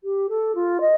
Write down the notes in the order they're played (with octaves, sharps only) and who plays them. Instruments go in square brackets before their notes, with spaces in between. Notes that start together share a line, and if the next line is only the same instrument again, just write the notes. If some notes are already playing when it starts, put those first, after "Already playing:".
[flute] G4
A4
F4
D#5